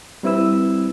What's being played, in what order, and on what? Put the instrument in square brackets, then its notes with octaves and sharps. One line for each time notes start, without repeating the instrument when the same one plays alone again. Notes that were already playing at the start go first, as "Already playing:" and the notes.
[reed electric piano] G3 C4 E4 B4 E6